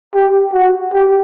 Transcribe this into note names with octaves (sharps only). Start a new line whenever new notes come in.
G4
F#4
G4